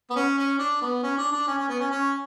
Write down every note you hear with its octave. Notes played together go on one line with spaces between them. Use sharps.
B3
C#4
C#4
D4
B3
C#4
D4
D4
C#4
C#4
B3
C#4
C#4